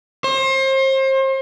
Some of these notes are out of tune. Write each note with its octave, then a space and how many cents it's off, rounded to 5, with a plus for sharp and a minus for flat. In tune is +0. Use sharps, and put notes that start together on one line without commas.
C5 +35